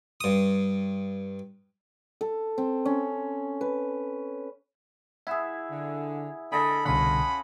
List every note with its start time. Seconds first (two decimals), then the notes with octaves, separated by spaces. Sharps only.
0.21 G2 D#6
2.21 A4
2.58 C4
2.85 C#4
3.61 B4
5.27 E4 G#4 E5 F#5 E6
5.70 D3
6.52 D3 G#4 A4 D#5 B5
6.86 C2 B2 D3 C#4 F4 F#5 G#5 B5